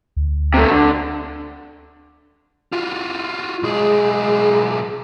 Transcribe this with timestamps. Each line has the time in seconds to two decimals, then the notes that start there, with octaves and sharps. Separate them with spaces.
0.17 D2
0.54 C3 A3
0.70 D3
2.73 F4 F#4
3.63 B1 G#3 G#4